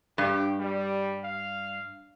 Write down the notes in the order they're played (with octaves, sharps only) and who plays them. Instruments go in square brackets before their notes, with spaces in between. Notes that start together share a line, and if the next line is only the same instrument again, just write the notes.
[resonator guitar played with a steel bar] G2 [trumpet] G4
[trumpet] G3
F5